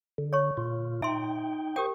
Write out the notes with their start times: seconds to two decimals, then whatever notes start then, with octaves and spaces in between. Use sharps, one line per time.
0.18 D3
0.33 C#5 C#6
0.57 A#2 F4
1.02 D#4 E5 G5 C6
1.76 G4 A#4 C5 G5 C#6